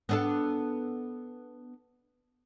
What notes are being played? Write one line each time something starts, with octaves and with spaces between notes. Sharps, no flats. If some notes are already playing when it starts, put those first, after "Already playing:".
B3 D4 A4